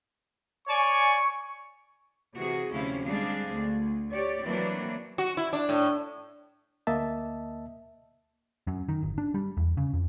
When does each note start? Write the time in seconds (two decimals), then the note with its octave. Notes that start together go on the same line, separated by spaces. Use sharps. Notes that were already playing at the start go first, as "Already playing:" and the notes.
0.68 C#5 D5 G#5 C#6
2.33 C3 E3 F#4 G#4
2.71 D2 C3 F3 C#4 E4 F5
3.05 G3 G#3 C4 D4 G#4 F5
3.51 D2
4.12 G4 C#5 D5
4.44 E3 F#3 A#3 C4 D4
5.18 F#4
5.37 E4
5.53 D4
5.69 A2
6.87 D2 A#3 D#5 E5 A5
8.67 F#2
8.89 D#3
9.03 G1
9.18 D4
9.34 G3
9.57 E2
9.77 C#3
9.93 F2